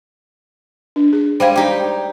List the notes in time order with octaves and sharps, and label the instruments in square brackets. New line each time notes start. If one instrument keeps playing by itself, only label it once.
[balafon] D4
G#4
[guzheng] G3 G#3 G#5 [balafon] C5 F5
[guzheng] D#4 G4